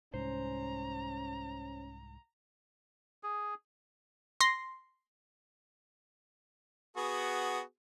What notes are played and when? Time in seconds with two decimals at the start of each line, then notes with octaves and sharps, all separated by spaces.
0.14 C2 G#2 C#4 C5 A#5
3.23 G#4
4.41 C6 A#6
6.97 B3 F#4 G#4